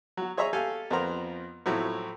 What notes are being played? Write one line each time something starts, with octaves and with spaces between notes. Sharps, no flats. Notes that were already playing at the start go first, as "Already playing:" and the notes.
F#3 F#4
G#4 C#5 D#5 E5 A#5
G4 A4 F5 G#5
F2 F3 B3 A#4 A#5
A2 F3 F#3 C4 E4